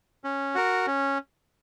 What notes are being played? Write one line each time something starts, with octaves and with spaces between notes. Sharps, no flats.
C#4
F#4 A#4
C#4